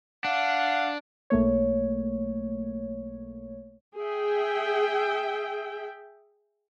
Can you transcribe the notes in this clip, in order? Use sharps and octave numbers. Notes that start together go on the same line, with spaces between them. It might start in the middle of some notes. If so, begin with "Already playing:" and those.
D4 F5 F#5
B1 A3 A#3 C#5
G#4 E5 G5